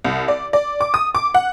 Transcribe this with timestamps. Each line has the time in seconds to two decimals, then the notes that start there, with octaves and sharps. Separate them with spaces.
0.04 C2
0.28 D5
0.53 D5
0.81 D6
0.94 D#6
1.15 D6
1.34 F#5